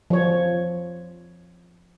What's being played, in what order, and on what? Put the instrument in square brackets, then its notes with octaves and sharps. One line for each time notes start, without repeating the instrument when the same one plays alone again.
[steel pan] F3 C#5